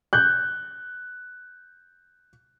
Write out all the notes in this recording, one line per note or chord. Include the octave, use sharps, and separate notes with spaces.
F#6 G6